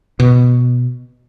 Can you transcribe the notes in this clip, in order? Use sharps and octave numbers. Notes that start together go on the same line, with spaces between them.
B2